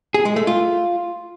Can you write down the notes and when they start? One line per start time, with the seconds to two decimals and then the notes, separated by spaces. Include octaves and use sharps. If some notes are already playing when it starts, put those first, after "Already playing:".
0.14 G#4
0.25 G#3
0.36 A3
0.47 F4